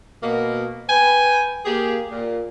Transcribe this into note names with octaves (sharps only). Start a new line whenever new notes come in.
B2 A#3
B4 G5 G#5
A#3 G4 G#4
A#2